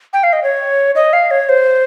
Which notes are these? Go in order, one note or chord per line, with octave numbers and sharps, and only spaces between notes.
G5
F5
D#5
C#5
D#5
F5
C#5
C5